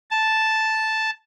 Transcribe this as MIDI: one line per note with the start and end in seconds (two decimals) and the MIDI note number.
0.11 1.10 81